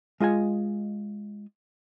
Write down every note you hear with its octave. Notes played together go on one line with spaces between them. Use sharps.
G#3 F4 D#5 G#5